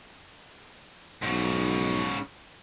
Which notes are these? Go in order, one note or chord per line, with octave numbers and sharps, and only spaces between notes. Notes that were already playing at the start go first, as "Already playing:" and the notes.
B1 G#2 C#3